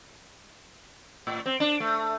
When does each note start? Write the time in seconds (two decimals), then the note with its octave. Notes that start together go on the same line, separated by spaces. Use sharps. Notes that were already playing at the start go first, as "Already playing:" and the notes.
1.27 A2
1.46 C4
1.60 D4
1.80 A3